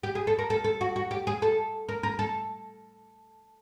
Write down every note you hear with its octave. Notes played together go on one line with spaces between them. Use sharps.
G4
G#4
A4
A#4
A4
A4
F#4
F#4
G4
G#4
A4
A#4
A#4
A4